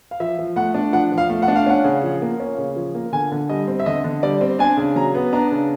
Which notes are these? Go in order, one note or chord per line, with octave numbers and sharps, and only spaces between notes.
F5
F3 E5
F3
A3 F#5
D4
F3 F#5
F3
F5
A3
F#5
D4
F5
C#4 F#5
C#3
F3
A#3
C#4
C#3
F3
A#3
D3 G#5
D3
G3 D#5
C4
E5
D3 D#5
D3
G3 D5
C4
D4 G#5
C#3
F#3 A#5
B3
D4 A#5
C#3